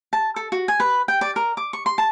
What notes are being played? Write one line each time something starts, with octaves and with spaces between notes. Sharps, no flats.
A5
A4
F#4
G#5
B4
G5
D5
A#4
D6
C#6
C6
A5